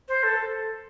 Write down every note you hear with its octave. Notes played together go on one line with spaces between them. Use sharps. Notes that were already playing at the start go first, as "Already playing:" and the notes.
C5
A4